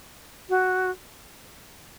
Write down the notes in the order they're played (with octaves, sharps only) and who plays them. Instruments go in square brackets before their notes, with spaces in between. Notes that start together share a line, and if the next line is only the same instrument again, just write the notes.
[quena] F#4